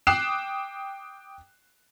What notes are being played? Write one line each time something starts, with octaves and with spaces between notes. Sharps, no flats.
G5 D6 D#6 F#6 C7 E7